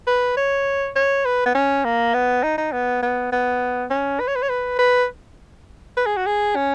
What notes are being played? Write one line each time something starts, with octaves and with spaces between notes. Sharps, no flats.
B4
C#5
C#5
B4
B3
C#4
A#3
B3
D#4
D#4
B3
B3
B3
C#4
B4
C#5
B4
C#5
B4
B4
B4
G#4
F#4
G#4
C#4